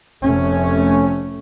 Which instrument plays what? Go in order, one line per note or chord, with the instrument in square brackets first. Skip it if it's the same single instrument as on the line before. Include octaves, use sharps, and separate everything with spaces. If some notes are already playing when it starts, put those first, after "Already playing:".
[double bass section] F1 C3 A3 C#4